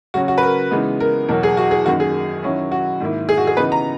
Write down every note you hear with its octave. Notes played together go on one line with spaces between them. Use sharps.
C#3 F#3 C#4 F#4
F#4
B4
A#4
C#3 E3 G#3 B3 D#4
A#4
E2 B2 F#3 A#4
G#4
F#4
G#4
F#2 D#3 A#3 F#4
G#4
D#3 F#3 C#4 E4
F#4
G#2 D#3 A#3 E4
G#4
F#4
G#4
C#3 E3 B3 D#4 B4
A#5